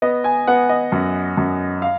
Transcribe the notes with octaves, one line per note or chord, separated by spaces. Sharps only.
B3 D#5
G#5
B3 F#5
D#5
F#2
F#2
F5